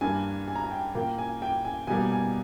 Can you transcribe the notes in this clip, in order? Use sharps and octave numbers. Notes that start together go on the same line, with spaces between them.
G2 G3 A#3 G#5
G#5
A#5
G#5
G5
A#2 A#3 G5
G#5
G5
G#5
B2 G3 A#3 G#5
G#5